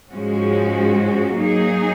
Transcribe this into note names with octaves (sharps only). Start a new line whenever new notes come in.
G#2 F3 G#3 C#4 F#4
F#3 A#3 D#4 G#4